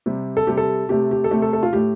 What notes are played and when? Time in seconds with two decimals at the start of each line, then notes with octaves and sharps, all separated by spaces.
0.06 C3 G3
0.37 A4
0.47 C3 G3 G4
0.57 A4
0.89 C3 A3 G4
1.11 G4
1.24 A4
1.31 C3 A3 G4
1.42 A4
1.53 A4
1.63 F4
1.73 A2 A3 G4